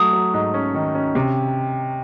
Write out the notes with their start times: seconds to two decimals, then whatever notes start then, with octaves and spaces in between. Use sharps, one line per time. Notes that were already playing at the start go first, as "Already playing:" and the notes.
Already playing: F#3 A3 D#6
0.13 F#3
0.34 G#2
0.54 C#4
0.74 D#3
0.95 C#4
1.15 C3